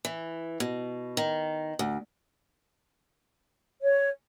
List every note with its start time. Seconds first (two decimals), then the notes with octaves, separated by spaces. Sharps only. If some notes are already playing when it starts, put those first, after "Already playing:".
0.05 E3
0.60 B2
1.17 D#3
1.79 D2
3.83 C#5